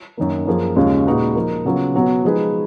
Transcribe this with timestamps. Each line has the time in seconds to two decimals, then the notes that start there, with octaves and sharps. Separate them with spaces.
0.17 F#2 D#3 A#3
0.47 F#2 F3 A#3 F4 G#4
0.76 D#2 C#3 G#3 C#4 F4
1.06 A#2 G#3 D#4 F#4 B4
1.35 F3 A#3 D#4
1.65 C#3 F#3 B3 F4
1.95 B2 F#3 B3 F#4
2.23 F3 G#3 D#4 G#4 B4